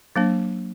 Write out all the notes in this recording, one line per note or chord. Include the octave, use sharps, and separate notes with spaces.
F#3 A#3 D4